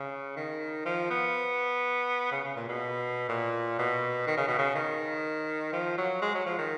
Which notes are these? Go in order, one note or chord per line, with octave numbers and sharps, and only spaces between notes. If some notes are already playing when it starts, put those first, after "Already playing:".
Already playing: C#3
D#3
F3
B3
C#3
C#3
A#2
B2
A#2
B2
D#3
C#3
B2
C#3
D#3
F3
F#3
G#3
F#3
F3
D#3